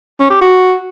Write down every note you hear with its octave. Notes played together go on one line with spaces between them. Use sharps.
C#4
G4
F#4